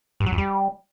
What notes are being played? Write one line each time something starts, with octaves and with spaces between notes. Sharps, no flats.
G2
F#3
F2
G3